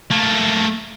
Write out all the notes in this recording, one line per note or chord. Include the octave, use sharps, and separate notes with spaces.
A3 A#3